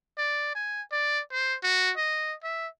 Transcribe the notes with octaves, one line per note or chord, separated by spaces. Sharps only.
D5
G#5
D5
C5
F#4
D#5
E5